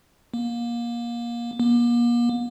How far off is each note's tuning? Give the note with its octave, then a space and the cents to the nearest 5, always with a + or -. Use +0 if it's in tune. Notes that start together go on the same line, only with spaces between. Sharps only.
A#3 +25
A#3 +40